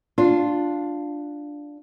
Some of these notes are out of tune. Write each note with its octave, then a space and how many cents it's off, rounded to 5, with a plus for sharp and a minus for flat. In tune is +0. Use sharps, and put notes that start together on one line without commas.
D4 +0 F4 +0